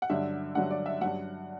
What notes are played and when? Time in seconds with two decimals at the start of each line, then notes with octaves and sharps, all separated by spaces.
0.02 F#5
0.10 G2 D3 F#3 E5
0.55 G2 D3 F#3 F#5
0.71 D5
0.86 E5
1.01 G2 F#3 F#5